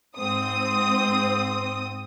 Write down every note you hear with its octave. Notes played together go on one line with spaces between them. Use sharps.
G#2 C4 D#6